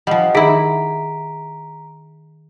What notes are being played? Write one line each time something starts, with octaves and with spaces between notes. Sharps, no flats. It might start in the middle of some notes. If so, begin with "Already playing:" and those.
F3 G3 D#5 F#5
D#3 E4 G#4 E5 F#5 A#5 B6 D7